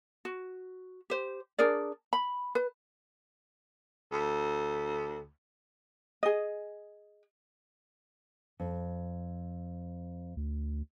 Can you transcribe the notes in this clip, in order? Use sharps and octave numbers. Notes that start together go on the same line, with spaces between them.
F#4
G4 C5
D4 G#4 A#4 D5
B5
B4
D2
G#4 D#5
F2
D2